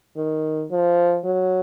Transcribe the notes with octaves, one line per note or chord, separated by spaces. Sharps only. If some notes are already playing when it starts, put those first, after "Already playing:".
D#3
F3
F#3